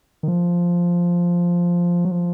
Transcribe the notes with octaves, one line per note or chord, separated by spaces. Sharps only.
D#3
F3
F#3
F3